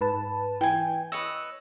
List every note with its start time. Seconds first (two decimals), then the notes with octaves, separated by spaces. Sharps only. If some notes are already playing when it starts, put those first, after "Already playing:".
0.01 G#2 B4 A5
0.61 E3 G5 G#5
1.12 B4 C#5 D#5 E6